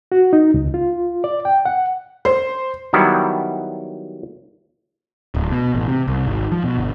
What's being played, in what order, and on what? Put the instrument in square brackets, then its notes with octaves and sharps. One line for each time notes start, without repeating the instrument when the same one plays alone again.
[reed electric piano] F#4
D#4
C#2
F4
D5
G5
F#5
[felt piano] C5
[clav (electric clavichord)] D#3 F#3 G3 B3 E4
[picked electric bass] D1
B2
A1
C3
C2
G#1
F3
B2
G1